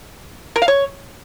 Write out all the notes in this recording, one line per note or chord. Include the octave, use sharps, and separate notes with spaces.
A#4
F5
C#5